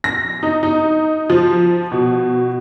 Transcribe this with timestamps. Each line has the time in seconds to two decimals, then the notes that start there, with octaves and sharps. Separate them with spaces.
0.04 A#6
0.43 D#4
0.63 D#4
1.30 F3
1.92 B2